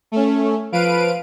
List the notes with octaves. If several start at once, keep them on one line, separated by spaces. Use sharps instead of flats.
A3 C#4
F3 B4 F5 D7 D#7